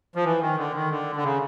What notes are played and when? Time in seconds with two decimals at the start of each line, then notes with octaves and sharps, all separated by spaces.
0.15 F3
0.24 E3
0.41 D#3
0.57 D3
0.75 D#3
0.90 D3
1.16 D3
1.23 C#3